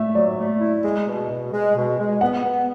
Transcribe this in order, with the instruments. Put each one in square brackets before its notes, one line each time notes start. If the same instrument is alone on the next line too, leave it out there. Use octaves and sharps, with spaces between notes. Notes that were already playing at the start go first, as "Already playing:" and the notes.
Already playing: [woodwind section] A3 [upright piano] E5
[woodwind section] F#3 [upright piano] D5
[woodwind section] A3
E4
G#3
B2
B2
G#3
B2
G#3
[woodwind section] B3 [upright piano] F#5
[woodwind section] B3